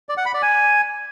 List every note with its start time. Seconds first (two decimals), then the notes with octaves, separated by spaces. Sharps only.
0.09 D5
0.17 F#5
0.26 B5
0.34 D5
0.42 G#5